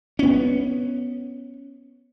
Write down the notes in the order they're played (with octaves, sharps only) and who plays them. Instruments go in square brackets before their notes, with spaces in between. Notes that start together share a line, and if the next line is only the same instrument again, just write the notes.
[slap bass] B3 C#4